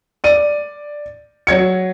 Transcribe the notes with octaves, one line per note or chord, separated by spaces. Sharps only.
D5 D#7
F#3 G#6 C#7